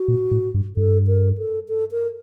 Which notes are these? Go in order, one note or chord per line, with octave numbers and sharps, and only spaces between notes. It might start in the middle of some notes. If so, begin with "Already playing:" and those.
Already playing: F#4
A#2
A2
G2
G2 A4
A#4
A4
A4
A#4